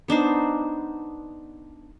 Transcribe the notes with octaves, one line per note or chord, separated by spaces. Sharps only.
B3 D4 D#4 C5